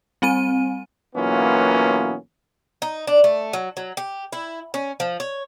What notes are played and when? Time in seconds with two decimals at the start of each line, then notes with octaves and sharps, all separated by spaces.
0.22 G3 C4 G#5 D#7
1.16 B1 E3 A#3 B3 C#4 F4
2.82 D#4
3.07 D4
3.24 A3
3.53 F#3
3.77 F#3
3.97 G4
4.32 E4
4.74 C#4
5.00 F3
5.20 C#5